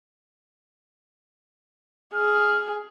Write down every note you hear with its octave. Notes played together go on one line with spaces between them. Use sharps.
G#4 F6